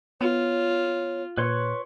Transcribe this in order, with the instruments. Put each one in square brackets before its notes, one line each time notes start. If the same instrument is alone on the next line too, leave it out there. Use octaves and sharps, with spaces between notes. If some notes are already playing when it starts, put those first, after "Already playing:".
[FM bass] B3 [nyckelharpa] F4 [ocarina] C#5
[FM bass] A#2 [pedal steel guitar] B4 C#5 C6